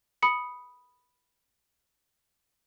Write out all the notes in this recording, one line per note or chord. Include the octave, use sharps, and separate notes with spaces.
B5 D#6 C#7